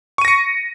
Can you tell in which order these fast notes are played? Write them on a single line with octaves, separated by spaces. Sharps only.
C#6 D#7 A#6 C#7